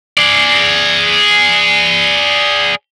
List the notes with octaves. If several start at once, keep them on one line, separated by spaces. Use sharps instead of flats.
G#4 D5